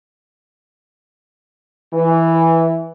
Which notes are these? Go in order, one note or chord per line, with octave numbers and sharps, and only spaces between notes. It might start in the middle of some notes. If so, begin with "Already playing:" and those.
E3